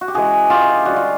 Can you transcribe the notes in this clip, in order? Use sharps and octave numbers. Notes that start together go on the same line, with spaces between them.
F#4
G4
C#3 E3 G#3 F#4 G#4
F4 G4
D3 G3 F#4
F4